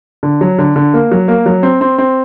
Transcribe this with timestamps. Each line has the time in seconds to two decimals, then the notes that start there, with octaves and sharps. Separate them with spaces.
0.23 D3
0.41 F#3
0.58 D3
0.76 D3
0.94 A#3
1.11 F#3
1.28 A#3
1.46 F#3
1.63 C4
1.81 C4
1.98 C4